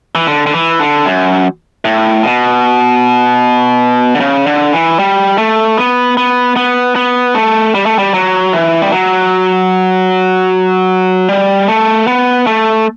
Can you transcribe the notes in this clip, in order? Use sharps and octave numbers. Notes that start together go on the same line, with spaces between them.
E3
D3
D3
E3
D3
F#2
A2
B2
D3
C#3
D3
E3
G3
A3
B3
B3
B3
B3
A3
G3
A3
G3
F#3
E3
G3
F#3
G3
A3
B3
A3